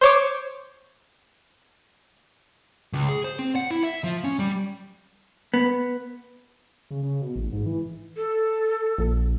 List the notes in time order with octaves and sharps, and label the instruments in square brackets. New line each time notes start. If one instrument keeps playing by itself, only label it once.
[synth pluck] C5 C#5 D6
[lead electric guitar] C#2
G#4
C5
C4
F#5
E4
E5
F3
C#4
G3
[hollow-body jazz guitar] B3
[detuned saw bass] C#3
C#3
B2
A1
G#2
E3
[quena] A4
[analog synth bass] A#1